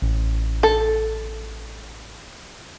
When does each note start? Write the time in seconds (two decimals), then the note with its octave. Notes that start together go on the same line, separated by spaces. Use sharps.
0.02 A1
0.63 A4